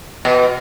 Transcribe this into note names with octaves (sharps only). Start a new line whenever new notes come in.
B2